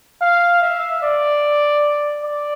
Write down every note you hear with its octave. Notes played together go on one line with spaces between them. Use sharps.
F5
E5
D5
D5